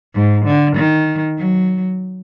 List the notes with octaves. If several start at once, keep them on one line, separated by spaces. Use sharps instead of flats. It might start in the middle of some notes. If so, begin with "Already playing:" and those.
G#2
D3
D#3
F#3